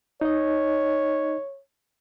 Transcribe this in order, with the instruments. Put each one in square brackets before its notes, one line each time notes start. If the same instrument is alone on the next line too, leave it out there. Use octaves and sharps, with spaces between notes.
[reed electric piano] D#4 D#5 [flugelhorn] C#5